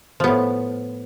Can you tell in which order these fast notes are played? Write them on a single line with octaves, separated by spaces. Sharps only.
F3 B3 A2